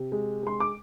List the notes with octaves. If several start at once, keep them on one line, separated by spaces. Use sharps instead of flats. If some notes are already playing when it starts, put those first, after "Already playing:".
Already playing: C3
G#3
G#3 C6
D6